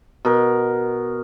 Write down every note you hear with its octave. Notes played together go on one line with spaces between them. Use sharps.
B2 A#4